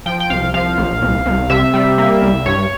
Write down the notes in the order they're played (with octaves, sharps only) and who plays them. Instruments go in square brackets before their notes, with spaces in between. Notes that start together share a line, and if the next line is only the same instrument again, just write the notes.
[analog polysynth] F3 G5
G5
C2 F5
F3 F5
A#1
C2
C2
C3 E5
G3
A#3
C2
G2 C#5